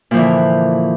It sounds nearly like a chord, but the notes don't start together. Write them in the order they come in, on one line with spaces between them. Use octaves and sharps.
A#2 F3 E3 D3